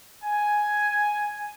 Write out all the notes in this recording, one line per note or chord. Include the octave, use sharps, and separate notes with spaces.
G#5